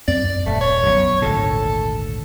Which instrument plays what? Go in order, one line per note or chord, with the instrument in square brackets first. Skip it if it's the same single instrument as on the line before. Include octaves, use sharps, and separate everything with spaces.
[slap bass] F#2 C4 [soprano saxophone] D5
[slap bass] D#1 [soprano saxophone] A3
[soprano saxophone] C#5
[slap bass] B1 F#2
[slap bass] G#1 D2 A#2 [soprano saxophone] A4